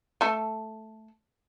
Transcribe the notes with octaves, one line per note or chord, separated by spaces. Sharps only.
A3 A4